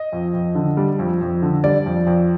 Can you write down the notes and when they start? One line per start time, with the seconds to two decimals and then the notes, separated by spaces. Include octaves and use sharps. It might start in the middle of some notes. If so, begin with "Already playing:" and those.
Already playing: D#5
0.12 F2
0.34 F2
0.55 D3
0.77 G3
0.99 F2
1.21 F2
1.42 D3
1.64 G3 D5
1.86 F2
2.07 F2